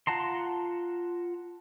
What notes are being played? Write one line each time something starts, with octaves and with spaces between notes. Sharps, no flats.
F4 F#5 A5 A#5 C6